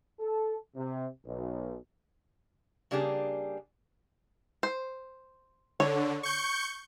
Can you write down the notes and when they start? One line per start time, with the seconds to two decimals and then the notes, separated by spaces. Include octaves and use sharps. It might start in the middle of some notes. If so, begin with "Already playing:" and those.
0.20 A4
0.76 C3
1.26 B1
2.91 C#3 G3 A#3 D4 G4 G#4
4.63 C5
5.80 D3 C#5
6.23 C#6 G6 C#7